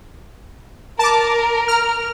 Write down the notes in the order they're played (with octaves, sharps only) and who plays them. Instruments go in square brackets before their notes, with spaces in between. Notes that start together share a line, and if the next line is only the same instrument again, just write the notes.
[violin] A#4 [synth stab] A5 D6
[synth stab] A#5 F6